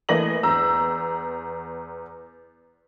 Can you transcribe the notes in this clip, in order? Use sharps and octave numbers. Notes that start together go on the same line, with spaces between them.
E3 A3 A#3 D#5 A#6 F#7
E2 A#5 E6